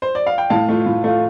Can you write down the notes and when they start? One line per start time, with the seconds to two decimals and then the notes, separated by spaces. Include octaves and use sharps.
0.02 C5
0.15 D5
0.27 F5
0.38 G5
0.50 A2 F5 A5
0.69 A3 F4
0.86 A2
1.04 A3 F4